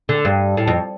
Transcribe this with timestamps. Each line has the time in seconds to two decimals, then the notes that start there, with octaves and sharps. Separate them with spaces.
0.09 D3
0.25 G2
0.57 A2
0.68 F2